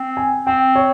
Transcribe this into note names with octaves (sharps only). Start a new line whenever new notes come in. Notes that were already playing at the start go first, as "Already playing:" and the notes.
Already playing: C4
G#5
C4 G5
C#5